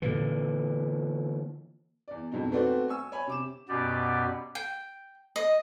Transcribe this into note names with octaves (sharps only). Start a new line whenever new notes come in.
A#2 D3 E3
E2 D5
F2 G#2 B2 D#4
A3 B3 C4 F#4 D5
G#5 C#6 E6
C#5 G#5 B5
C3 D6 E7
F#2 B2 B3 G4 D5
G5
D#5